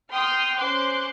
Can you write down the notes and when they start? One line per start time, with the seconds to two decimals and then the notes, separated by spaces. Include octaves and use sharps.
0.10 G5 C6 D#6 F6
0.55 C#4 C5 C6 D6 F#6